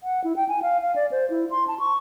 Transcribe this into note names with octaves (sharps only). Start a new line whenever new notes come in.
F#5
E4
G5
G#5
F5
F5
D5
C5
E4
C6
A5
C#6